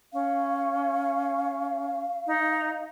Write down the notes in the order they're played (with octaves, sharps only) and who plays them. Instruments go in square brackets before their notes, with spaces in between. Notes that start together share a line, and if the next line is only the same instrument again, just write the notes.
[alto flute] C#4 [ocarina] F5
[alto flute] D#4